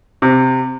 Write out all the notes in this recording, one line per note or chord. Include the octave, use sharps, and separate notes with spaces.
C3